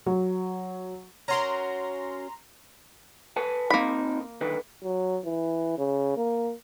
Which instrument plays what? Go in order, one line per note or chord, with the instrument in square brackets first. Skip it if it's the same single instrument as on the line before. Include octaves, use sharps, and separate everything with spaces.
[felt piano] F#3
[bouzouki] C#4 F#4 A#4 [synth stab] A#5 C6
[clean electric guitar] B4 G#5 A5
[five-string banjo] A#3 B5 [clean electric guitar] C4 D#4 A#4
[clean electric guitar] D3 D#3 B4
[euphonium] F#3
E3
C#3
A#3